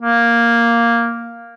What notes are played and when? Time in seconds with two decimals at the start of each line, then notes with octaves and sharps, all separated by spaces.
0.02 A#3